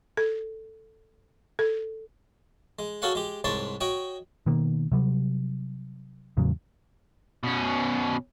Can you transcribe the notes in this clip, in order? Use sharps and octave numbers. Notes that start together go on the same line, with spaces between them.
A4
A4
G#3
F#4 G#4 A4 C#5 F5 F#5
G#3 G4
C2 G#2 C#5 D5 A5 C6
F#4 C#5 D#5 G5
B2 D#3 A#3
C3 F#3 G3
E2 A2 C#3 F#3
B2 C#4